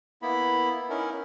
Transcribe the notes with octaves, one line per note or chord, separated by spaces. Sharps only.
A#3 B3 E4 B5
C#4 D#4 E4 A#4